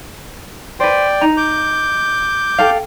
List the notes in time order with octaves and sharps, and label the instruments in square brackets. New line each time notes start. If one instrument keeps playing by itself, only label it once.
[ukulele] B4 C5 [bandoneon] D5 G5
[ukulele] D#4 A#5
[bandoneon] D6 G6
[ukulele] G4 A4 F5